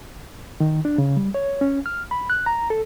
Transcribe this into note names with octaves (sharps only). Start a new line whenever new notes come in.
D#3
D4
C#3
G3
C#5
C#4
F6
B5
F#6
A#5
A4